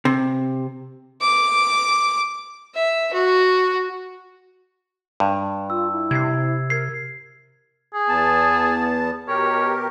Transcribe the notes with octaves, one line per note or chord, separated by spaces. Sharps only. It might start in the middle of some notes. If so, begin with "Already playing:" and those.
C3
D6
E5
F#4
G2
F4 E6
E4
C3 G#6 C7
A#4 G#6 C7
G#4
E2 B3 A5
B2 G4 A#4 C#5